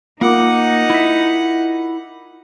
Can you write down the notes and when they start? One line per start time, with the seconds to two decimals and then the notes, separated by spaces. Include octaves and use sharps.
0.21 A#3 D#4 F4 A#4 F#5 D6
0.90 E4 E5